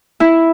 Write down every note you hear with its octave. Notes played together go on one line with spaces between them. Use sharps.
E4